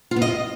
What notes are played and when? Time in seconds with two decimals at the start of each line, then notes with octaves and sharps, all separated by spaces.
0.11 F4
0.16 B3
0.22 D#5